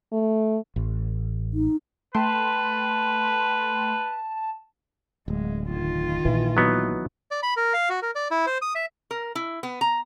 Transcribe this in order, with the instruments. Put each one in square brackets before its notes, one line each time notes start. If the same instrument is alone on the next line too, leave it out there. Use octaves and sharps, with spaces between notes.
[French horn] A3
[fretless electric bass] A1
[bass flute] D#4
[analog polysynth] A3 G5 C6 [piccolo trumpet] B4 [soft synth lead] A5
[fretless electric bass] D1 [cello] G#3
[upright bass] F1 [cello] D#3 F4
[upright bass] A#1 A#2 [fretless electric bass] E3
[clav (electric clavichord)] F#3 B3 D#4
[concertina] D5
B5
A#4
F5
F#4
A#4
D5
E4
C5
D#6
E5
[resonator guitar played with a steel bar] A#4
E4
B3
A#5